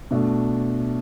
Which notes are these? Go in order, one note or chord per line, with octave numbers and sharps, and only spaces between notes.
B2 A3 D4